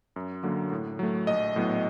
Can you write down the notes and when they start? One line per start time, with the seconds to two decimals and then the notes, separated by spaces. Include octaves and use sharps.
0.16 F#2
0.43 D3 F#3 A#3
0.72 A2
0.99 F#3 A3
1.27 A#1 D#5
1.56 A2 F#3 B3